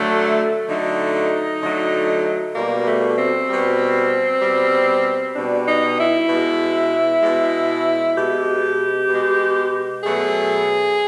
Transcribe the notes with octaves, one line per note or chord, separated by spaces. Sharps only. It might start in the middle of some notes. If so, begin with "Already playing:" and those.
Already playing: D3 F#3 A3
D3 F#3 A3 D#4
D3 F#3 A3
B2 G3 A#3
A3
C4
B2 G3
B2 G3
B2 G3 D4
D#4
E4
B2 G#3
B2 G#3
B2 G#3 G4
B2 G#3
B2 F#3 A3 G#4